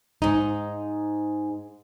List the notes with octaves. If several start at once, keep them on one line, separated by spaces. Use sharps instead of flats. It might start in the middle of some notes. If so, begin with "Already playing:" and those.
G#2 D#4